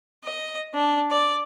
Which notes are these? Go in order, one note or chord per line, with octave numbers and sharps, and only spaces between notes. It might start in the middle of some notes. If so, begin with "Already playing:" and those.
D#5
D4
D5